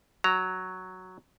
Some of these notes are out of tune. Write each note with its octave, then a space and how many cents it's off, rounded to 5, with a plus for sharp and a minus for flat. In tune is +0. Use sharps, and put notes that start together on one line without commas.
F#3 +0 A#5 +0